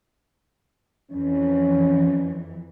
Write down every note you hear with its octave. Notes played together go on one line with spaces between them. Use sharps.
F2 E3 C#4